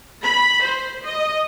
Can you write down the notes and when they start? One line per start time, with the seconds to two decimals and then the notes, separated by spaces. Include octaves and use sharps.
0.22 B5
0.62 C5
1.05 D#5